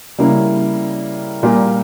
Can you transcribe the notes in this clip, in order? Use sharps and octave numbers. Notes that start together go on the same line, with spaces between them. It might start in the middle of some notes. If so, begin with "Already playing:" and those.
C#3 G3 A#3 C#4 E4
A#2 G3 A#3